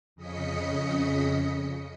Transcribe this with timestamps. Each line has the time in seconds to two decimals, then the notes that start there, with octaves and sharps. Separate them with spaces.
0.16 F2 C#3 D#5 D#6 B6 C#7